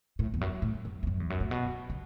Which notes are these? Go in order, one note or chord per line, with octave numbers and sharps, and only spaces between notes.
A2
E2
F#2
A2
F#2
E2
F#2
E2
F#2
A2
B2
C#3